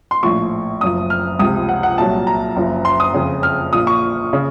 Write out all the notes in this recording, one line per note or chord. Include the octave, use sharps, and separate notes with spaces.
C6
A#1 A2 F3 C#6
F#1 F#2 F3 D#6
F6
C#2 C3 F3 D#6
F#5
F#5
C2 A#2 F#3 A5
A#5
F#1 F#2 F3
C6
D#6
F2 C#3 F3
F6
A#1 A#2 F3 D#6
C#6
C#3